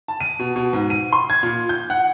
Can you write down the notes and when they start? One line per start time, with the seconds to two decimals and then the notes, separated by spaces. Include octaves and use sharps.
0.08 A5
0.20 D#7
0.39 B2
0.56 B2
0.73 G#2
0.90 D#7
1.13 C6
1.30 G#6
1.43 A#2
1.69 G6
1.90 F#5